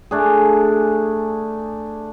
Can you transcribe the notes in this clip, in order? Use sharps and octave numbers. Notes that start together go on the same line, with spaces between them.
A3 D4 G#4